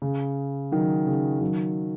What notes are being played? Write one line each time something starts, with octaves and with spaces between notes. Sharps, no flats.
C#3
D#3 F#3
C#3
D#3 F#3